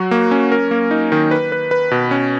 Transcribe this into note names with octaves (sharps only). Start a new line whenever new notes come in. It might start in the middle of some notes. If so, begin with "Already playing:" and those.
Already playing: F#3 F#4
A#3
C#4
A#4
A#3
D#4
D#3
B4
B4
B4
B2
C#4